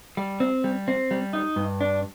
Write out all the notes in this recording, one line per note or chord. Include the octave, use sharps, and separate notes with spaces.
G3
C4
G3
C4
G3
D#4
G2
D4